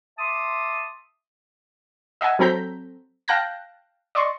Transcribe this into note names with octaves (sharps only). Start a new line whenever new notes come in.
E5 A5 C6 D6 D#6
D#5 E5 F#5 G#5
F#3 C4 A4 A#5 G6 B6
F5 G5 A5 F#6 G6 A#6
D5 D#5 C6 C#6